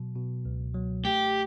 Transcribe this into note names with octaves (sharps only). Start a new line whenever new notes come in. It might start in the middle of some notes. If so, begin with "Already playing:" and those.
Already playing: B2 F#3
B2
C#2
F#3
A3 G4